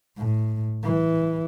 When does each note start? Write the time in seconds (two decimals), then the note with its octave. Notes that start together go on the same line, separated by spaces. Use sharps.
0.17 A2
0.83 E3